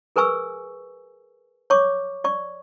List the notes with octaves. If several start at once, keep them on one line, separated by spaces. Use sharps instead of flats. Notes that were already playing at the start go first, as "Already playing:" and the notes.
G#4 A#4 B4 G#5 C#6 E6
C#5 C#6 D6
D5 C#6